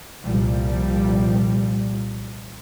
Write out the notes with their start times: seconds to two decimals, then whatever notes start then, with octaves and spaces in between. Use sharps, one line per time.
0.24 C2 A#2 F3 G3